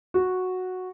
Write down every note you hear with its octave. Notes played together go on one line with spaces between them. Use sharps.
F#4